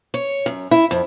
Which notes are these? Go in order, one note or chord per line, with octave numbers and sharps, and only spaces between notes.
C#5
F#2
E4
F2